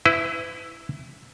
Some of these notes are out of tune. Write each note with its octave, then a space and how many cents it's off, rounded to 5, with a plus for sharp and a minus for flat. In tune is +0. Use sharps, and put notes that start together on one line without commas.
E4 +0 B4 +35